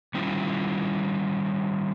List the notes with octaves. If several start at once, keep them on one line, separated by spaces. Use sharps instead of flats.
D#3 G3 C#4 E4 F4